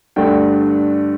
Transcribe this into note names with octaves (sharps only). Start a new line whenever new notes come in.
G2 D3 A3 G5